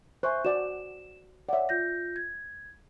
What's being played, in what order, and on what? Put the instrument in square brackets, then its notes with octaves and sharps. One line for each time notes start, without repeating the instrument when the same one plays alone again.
[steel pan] C5 G#5 [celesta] E5 C#6 F#6
[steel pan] F#4 D5 F#5 [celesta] E7
[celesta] C#5 F#5 [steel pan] D5 E5
[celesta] F4 G6 A#6
G#6